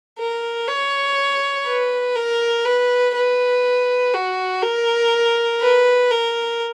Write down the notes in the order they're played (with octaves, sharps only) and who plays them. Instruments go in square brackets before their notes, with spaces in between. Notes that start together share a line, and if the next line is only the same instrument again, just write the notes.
[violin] A#4
C#5
B4
A#4
B4
B4
F#4
A#4
B4
A#4